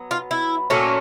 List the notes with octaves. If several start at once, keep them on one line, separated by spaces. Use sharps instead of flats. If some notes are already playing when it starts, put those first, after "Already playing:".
Already playing: F#3 B3
F4
E4
A#2 F#3 A3 C#4